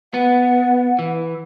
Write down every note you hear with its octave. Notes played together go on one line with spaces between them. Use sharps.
B3 F#5
E3